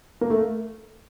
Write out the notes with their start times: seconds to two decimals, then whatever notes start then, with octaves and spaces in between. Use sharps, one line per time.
0.21 A#3
0.30 A3